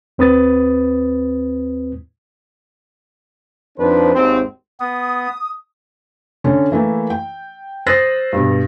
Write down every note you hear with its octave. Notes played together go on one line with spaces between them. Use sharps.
D#2 C4 B4 D#6 A6
F2 D#3 D4 B4 C5
G#1 D#2 C4
B3 D#6
D3 C#4 A4
E3 A3 A#3 E4
G5
C5 D#6 E6 F#6 A6 A#6
G2 B2